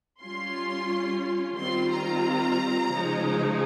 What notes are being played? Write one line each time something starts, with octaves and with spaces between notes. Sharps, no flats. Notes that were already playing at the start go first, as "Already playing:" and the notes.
G3 C#4 F4 C6
D#3 G3 C4 F4 C6
A#5
C#3 F3 G#3 D#4